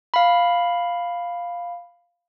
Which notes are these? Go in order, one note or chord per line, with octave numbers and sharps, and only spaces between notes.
F5 B5